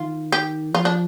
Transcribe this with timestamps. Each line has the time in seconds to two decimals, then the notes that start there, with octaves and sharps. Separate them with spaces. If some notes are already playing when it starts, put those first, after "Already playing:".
Already playing: D#3 F4
0.32 G4
0.74 F3 F4
0.85 D4